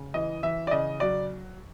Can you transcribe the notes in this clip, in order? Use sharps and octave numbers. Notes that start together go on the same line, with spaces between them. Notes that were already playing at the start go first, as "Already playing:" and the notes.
Already playing: C#3
E3 D#5
E3 E5
D5
C#3 D#5
F#3 D5